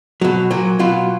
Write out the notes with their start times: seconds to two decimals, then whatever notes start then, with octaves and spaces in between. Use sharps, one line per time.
0.21 B2 F#3
0.51 A#2 F#3
0.79 B2 F#3 F4